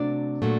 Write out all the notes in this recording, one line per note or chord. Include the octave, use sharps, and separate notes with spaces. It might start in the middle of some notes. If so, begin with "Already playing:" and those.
Already playing: C3 F#3 A3 D4 D5
A#2 F#3 A3